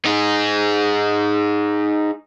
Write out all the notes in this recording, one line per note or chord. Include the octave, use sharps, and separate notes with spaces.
D#4 G#4